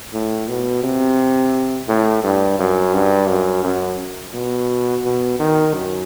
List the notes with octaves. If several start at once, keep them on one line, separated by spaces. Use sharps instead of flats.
A2
B2
C3
A2
G2
F#2
G2
F#2
F#2
B2
B2
D#3
F#2